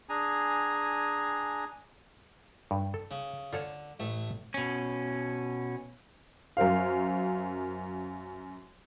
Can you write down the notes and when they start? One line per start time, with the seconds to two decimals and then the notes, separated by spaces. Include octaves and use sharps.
0.09 D4 G#4 G#5 A#5
2.71 G2
2.94 A4
3.11 C#3
3.53 D3 F4 A4 C#5
4.00 A1 A3
4.54 B2 C#4
6.57 F#2 A#4 C5 F5